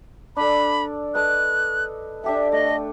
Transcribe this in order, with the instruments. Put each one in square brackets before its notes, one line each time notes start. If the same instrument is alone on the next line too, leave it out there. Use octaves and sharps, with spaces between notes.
[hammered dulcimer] D4 A4 [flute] B5
[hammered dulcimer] A4 B4 D#5 [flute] F#6
[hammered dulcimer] D4 G4 A4 [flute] E5
[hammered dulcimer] A3 [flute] D#5